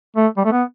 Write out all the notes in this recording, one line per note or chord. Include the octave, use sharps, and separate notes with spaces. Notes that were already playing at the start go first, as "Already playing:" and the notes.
A3
G3
A3
B3